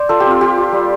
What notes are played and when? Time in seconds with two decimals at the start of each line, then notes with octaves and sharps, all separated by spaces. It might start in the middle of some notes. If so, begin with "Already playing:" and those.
Already playing: C5 D5
0.09 F4 A4
0.20 G4
0.26 C4
0.31 F4
0.41 F4 G4
0.58 F4
0.72 G3